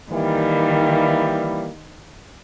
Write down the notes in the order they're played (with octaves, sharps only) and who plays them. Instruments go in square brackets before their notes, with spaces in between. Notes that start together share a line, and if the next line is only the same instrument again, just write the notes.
[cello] D#3 [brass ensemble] E3 G3 A#3